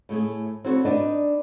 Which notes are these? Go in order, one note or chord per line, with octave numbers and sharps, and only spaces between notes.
A2 A3 E4 G#4
C4 E4 F#4 A4 A#4 C#5
D4 D#4 B4 D5 D#5